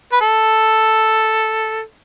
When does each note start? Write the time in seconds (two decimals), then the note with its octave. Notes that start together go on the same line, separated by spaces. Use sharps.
0.12 B4
0.21 A4